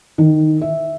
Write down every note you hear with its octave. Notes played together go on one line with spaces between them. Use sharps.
D#3
E5